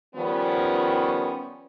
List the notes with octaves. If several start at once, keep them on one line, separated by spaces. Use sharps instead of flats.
D#3 F3 G3 B3 C#4